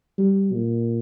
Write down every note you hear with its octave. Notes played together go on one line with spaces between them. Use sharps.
G3
A#2